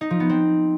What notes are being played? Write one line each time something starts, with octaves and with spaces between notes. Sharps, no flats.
D#4
F3
B3
C4